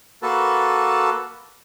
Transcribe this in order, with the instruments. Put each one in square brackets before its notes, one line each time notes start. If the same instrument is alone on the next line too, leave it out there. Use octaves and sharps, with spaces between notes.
[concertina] A#3 F#4 A4 B4 A5